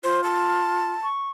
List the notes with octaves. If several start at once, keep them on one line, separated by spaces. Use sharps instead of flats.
F4 C5
A5
C#6